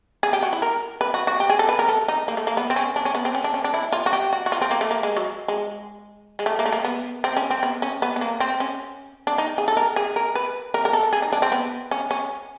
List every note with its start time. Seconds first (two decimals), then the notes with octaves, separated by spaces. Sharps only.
0.23 G#4
0.33 G4
0.43 F#4
0.53 E4
0.62 A#4
1.01 B4
1.14 F#4
1.27 F#4
1.40 G4
1.50 G#4
1.59 A4
1.69 B4
1.79 A#4
1.89 A4
2.08 D#4
2.28 A#3
2.37 A3
2.47 A#3
2.57 B3
2.70 C4
2.76 C#4
2.96 D4
3.05 C#4
3.15 B3
3.25 C4
3.35 C#4
3.44 D4
3.54 C#4
3.64 D4
3.74 E4
3.93 F4
4.06 F#4
4.13 G4
4.33 F#4
4.46 F#4
4.52 F4
4.62 C4
4.71 A#3
4.81 A3
4.91 A#3
5.03 G#3
5.17 F#3
5.48 G#3
6.39 G#3
6.46 A3
6.59 A#3
6.66 A3
6.73 A#3
6.85 B3
7.24 C4
7.37 C#4
7.51 C4
7.63 B3
7.82 C#4
8.02 B3
8.16 B3
8.21 A#3
8.40 C4
8.60 C#4
9.27 D4
9.38 D#4
9.58 G#4
9.68 A4
9.77 A#4
9.96 G#4
10.16 A#4
10.35 B4
10.74 A#4
10.85 A#4
10.93 A4
11.13 G#4
11.22 D#4
11.33 D4
11.42 C4
11.52 B3
11.91 C#4
12.11 C#4